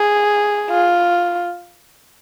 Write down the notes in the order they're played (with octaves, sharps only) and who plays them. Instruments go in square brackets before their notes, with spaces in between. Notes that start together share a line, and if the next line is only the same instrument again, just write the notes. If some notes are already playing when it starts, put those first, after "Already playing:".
Already playing: [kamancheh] G#4
F4